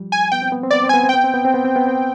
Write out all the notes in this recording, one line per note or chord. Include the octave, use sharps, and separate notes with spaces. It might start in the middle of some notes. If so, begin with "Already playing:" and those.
Already playing: F3 G3
G#5
B3 G5
C4
B3
C4
B3 D5
C4
B3 G#5
C4
B3 G5
C4
B3
C4
B3
C4
B3
C4